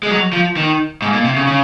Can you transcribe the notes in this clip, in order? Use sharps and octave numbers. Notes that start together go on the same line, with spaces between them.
G#3
F#3
F3
D#3
G#2
A#2
C3
C#3
C#3